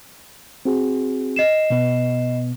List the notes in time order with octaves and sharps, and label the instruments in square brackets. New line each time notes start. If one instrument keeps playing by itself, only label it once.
[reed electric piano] C4 F#4 G#4
[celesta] D#5 C7 E7
[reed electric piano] B2 B3